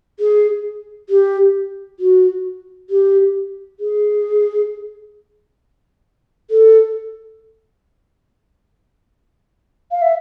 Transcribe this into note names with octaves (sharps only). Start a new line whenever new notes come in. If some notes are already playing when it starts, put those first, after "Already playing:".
G#4
G4
F#4
G4
G#4
A4
F5
E5